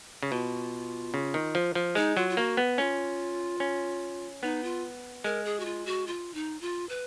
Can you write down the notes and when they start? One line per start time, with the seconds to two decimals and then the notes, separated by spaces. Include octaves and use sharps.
0.23 C#3
0.31 B2 F4
1.14 C#3
1.34 D#3
1.55 F3
1.75 F3
1.95 G#3 D#4
2.16 F#3 F4
2.29 F4
2.37 A#3 F#4
2.57 B3
2.78 C#4 F4
3.60 C#4
4.43 B3 D#4
4.64 F4
5.24 G#3 A#4
5.45 G#4
5.60 F#4
5.65 F4
5.86 F#4
6.07 F4
6.34 D#4
6.61 F4
6.89 B4